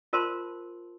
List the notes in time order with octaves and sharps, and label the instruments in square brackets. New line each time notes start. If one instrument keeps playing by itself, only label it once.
[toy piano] F4 A#4 C5 A5 C6